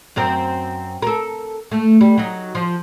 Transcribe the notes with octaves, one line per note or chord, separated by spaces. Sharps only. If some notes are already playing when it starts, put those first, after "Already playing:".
F#2 C4 A#4
A4 A#4
A3
G3
F#3 D#4
F3